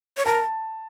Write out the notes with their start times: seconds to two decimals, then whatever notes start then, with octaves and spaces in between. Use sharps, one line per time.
0.17 C#5
0.26 A#4 A5